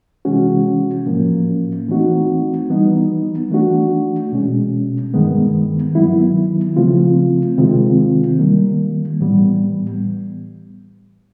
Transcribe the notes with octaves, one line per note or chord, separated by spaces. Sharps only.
C3 E3 G#3 C#4 F#4
A2 F3 A#3 C#4
E3 A3 C4 D#4 F#4
E3 G3 B3 D#4
E3 A3 D4 F#4
B2 G#3 C#4
G2 D#3 G#3 B3
D#3 F#3 B3 E4
C#3 F3 A3 C4 F4
C3 D#3 G#3 C4 F4
D#3 G3 A#3
A2 E3 G3 B3